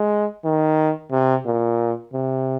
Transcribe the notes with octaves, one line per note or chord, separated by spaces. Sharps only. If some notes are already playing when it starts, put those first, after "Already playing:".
Already playing: G#3
D#3
C3
A#2
C3